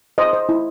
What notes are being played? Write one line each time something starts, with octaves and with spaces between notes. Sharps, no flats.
C5 D#5
C5
E4